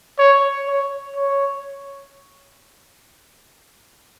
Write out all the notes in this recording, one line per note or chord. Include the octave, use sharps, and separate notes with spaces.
C#5
C#5
C#5